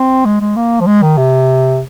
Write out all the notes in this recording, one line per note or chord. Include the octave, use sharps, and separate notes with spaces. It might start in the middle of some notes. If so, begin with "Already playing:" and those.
Already playing: C4
G#3
G#3
A#3
F3
G#3
D#3
C3